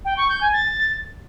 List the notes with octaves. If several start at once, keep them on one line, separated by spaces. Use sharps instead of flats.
G5
C#6
G6
G#5
A6